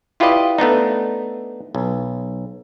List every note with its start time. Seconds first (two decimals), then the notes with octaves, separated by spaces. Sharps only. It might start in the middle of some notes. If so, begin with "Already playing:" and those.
0.20 E4 F4 G4 B4 D5 D#5
0.58 A3 B3 D4 D#4
1.75 B1